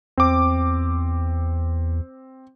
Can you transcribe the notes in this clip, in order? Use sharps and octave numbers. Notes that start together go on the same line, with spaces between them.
E2 C4 D6